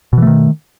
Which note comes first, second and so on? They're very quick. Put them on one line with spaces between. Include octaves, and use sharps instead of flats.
B2 E3 A3 D#3